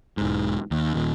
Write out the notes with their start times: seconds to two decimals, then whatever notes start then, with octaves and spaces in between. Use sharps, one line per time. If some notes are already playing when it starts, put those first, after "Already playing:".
0.17 E1 G#2
0.71 D#2
0.94 D#1 D#2